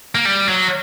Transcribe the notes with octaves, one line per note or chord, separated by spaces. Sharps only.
A#3
G3
F#3